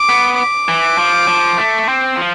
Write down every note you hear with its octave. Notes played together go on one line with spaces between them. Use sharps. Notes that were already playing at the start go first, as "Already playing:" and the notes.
Already playing: D6
B3
D6
E3
F3
F3
A3
C4
F3